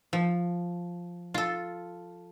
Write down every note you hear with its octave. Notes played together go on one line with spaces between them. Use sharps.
F3
F4 A4